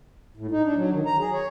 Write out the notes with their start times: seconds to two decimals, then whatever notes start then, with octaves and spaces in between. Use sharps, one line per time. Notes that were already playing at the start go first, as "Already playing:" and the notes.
0.37 A2
0.51 D#4
0.64 D4
0.76 F#3
0.91 D#3
1.06 A#5
1.19 G#4
1.33 C#5